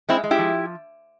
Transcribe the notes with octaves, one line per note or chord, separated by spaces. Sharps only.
G#3 C4 E4
G#3
E4 G4
F3